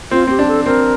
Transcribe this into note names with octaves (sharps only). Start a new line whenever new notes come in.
C4 F4
C4 G4
D4
A4
C4 A#4